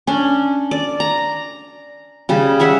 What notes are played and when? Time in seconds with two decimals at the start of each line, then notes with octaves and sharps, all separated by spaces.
0.07 C#4 D4
0.71 D5
1.00 A#5
2.29 C#3 G3
2.60 G#4 C#5 E5 F#5